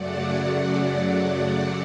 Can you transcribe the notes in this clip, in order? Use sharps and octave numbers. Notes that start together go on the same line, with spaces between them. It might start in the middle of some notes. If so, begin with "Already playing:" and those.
Already playing: F#2 C#3 F#3 A3 D5 F#5
D5 F#5
D5 F#5